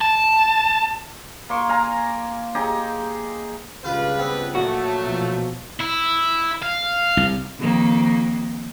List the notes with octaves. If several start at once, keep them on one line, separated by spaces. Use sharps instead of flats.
A5
A#3 C6 C#6
F5 G#5 A#5
D#4 G4 G#4 D#5
C#2 G2 F4 G4 B4 F5
B3 C4
A#1 F#3 A3 F#4
B2 F3
E4
F5
C2
F2 D#3 A#3